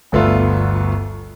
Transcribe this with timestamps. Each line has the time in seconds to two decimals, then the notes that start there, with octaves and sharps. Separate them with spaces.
0.12 G1 D2 A3 B3 F4